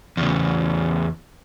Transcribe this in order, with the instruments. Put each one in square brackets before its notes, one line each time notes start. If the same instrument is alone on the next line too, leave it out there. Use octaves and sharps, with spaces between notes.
[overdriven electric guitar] E2 C#3